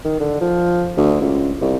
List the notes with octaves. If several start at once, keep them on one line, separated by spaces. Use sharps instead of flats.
D#3
D3
F3
D2
C#2
C2